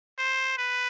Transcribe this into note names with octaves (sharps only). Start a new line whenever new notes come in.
C5
B4